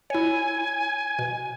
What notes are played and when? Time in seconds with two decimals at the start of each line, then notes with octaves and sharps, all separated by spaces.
0.10 E4 C#5 G#5
1.19 B2